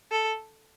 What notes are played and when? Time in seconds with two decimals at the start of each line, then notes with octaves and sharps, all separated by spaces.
0.12 A4